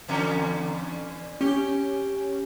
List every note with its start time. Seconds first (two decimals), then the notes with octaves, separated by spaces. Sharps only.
0.08 E2 D3 C#4
1.41 C#4 G4